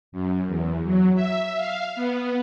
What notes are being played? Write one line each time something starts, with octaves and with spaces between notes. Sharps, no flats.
F#2
E2
F#3
E5
F5
B3